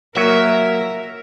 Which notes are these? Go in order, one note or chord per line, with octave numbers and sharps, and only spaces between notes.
F#3 A#3 F#4 A#4 E5